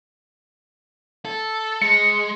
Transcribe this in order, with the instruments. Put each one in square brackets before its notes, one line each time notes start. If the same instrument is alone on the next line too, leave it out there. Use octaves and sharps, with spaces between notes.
[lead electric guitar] A4
[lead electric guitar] G#3 [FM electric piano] C#7